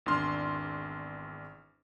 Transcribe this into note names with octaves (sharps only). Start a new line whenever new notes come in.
G#1 E2 D4 C6 F6